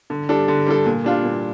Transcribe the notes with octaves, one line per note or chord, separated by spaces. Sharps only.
D3
G3 D4 A4
D3
G3 D4 A4
A#2
G3 D4 F4
A#2